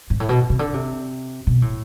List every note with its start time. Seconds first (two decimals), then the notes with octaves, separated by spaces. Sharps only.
0.10 G#2
0.20 A2
0.29 B2
0.50 C3
0.59 D3
0.74 C3
1.47 B2
1.62 A2